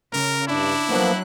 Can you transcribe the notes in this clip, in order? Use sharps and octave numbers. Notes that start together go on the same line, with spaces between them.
C#3 A#4
G2 D4 E4
F3 F#3 A#3 B3 F#6